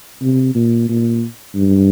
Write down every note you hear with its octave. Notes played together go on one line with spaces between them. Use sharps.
C3
A#2
A#2
G2